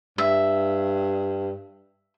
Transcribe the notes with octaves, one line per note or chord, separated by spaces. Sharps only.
G2 E5